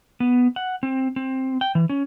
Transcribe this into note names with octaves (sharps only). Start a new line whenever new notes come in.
B3
F#5
C4
C4
G5
E3
C#4